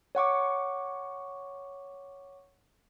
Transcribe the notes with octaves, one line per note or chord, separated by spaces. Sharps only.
C#5 F#5 C#6 D6